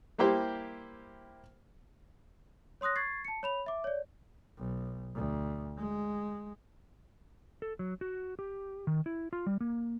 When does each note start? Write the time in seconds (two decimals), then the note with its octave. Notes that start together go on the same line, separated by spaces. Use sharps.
0.18 G3 A#3 E4 G4 C5 G5
2.81 C#5 C6 D#6 F#6 A#6
2.96 C#6 G#6 A6 C7
3.25 A5 C#7
3.43 C#5 B5 F7
3.66 E5 D6
3.84 C#5 D5
4.59 B1
5.15 D2
5.78 G#3
7.62 A4
7.79 F#3
8.01 F#4
8.39 G4
8.87 D#3
9.06 E4
9.33 F4
9.46 G3
9.61 A#3